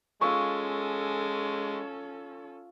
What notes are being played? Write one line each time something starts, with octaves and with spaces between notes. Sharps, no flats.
G#3 C#4 F4 A4 E5 C#6